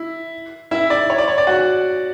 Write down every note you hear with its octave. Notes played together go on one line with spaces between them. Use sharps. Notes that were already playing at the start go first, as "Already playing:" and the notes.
Already playing: E4
E4 E5
D5
C#5
D5
C#5
D5
F#4 F#5